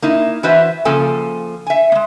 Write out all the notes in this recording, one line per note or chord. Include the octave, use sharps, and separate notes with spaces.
A#3 D#4 E4
E3 F#4 B4 C5 D#5 E5
C#3 F3 A#3 A4 G5 G#5
E5 G#5
G#3 A#3